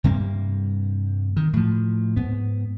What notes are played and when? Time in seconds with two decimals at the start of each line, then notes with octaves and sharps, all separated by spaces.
0.04 G2 C3 G3 A#3
1.37 D#3
1.53 A2 F3
2.16 G#2 B3